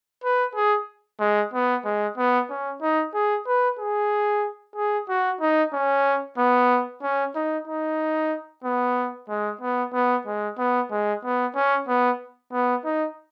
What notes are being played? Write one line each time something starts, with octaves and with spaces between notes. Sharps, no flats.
B4
G#4
G#3
B3
G#3
B3
C#4
D#4
G#4
B4
G#4
G#4
F#4
D#4
C#4
B3
C#4
D#4
D#4
B3
G#3
B3
B3
G#3
B3
G#3
B3
C#4
B3
B3
D#4